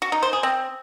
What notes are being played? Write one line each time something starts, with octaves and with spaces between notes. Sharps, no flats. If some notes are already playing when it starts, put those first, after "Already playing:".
F#4
D#4
C5
G#4
C4